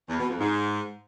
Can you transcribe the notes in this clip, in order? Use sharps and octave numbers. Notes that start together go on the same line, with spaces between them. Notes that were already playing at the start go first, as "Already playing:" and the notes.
E2
B2
F2
G#2